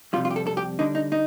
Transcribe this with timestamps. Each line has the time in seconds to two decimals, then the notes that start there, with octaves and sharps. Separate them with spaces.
0.13 F2 C3 G3 F4
0.25 F4
0.31 G4
0.36 A4
0.47 A4
0.57 G4
0.79 D3 G3 D4 D#4
0.95 D#4
1.12 D#4